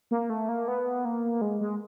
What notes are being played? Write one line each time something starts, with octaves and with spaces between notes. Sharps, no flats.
A#3
A3
A#3
B3
A#3
G#3
G#3